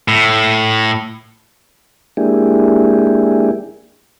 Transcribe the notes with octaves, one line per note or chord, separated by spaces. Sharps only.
A2
G#3 A#3 D4 E4 G4 G#4